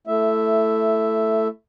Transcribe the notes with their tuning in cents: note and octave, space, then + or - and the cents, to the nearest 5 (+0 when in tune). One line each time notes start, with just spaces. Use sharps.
A3 +5 E4 +15 E5 +0